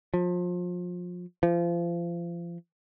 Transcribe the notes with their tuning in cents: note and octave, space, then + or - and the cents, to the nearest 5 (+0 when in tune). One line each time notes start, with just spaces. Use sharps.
F3 +30
F3 -30